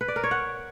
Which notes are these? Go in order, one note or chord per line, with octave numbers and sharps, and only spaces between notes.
B4
D5
A#4
C#5
F#5